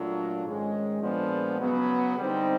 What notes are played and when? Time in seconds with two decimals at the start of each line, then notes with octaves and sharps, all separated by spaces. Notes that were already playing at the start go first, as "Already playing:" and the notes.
Already playing: A#2 F#3 A3 D4 F4
0.44 G#2 D#3 G#3 C#4
1.02 A#2 F3 G#3 B3 D4
1.60 C#3 F#3 B3
2.17 D3 G3 C4 D#4